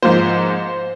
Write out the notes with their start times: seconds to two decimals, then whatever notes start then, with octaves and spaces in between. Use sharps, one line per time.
0.02 G#2 F3 A#3 C5